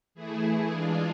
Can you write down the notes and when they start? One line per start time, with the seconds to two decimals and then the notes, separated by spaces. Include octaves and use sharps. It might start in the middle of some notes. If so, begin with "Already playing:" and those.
0.14 E3 A3 E4 G#4
0.68 E3 G#3 D4 F4 G#4